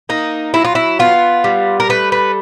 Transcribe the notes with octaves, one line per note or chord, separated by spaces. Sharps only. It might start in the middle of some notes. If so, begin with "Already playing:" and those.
A#3 D#4
F#3 E4
F4
E4
B3 F4
G3
A#4
A3 B4
B4